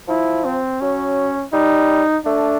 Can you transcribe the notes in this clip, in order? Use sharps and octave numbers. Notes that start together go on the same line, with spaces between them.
F3 E4
C4
F#3 C#4
G3 D#4
A3 D4